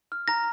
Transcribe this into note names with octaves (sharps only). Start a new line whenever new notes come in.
F6
A#5 A#6